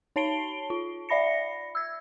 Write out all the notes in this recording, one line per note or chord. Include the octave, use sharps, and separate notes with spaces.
D#4 C#5 A5 C7 D7 G7
F4
D5 E5 B5 A#6 C#7
E6 G#6